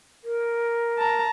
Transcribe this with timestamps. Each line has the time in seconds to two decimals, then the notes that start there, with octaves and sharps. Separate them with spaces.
0.24 A#4
0.99 A5 A#5